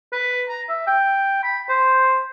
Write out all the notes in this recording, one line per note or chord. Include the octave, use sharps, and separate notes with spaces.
B4
A#5
E5
G5
B5
C5